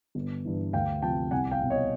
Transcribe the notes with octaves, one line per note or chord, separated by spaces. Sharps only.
G1
G2 E3
D2 F5 G5
C3 F3 G5 A5
C2 F#5 G#5
F5 G5
B2
C#5 D#5